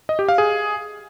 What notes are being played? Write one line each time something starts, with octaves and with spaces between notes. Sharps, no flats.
D#5
G4
F5
G#4